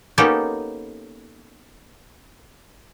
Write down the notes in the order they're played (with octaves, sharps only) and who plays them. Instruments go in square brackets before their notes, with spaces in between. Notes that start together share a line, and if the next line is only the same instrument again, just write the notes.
[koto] A#3 B3 C#4 D#4 G4 A4